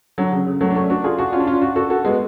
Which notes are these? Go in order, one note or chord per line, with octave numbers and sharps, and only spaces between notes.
D3 F#3
C#3
C#3
F#3 A3
D4
A3 C#4
D4 F#4
F4 G#4
D4 F#4
C#4 F4
D4
C#4 F4
D4 F#4
F#4 A4
F#4 A4
G#3 B3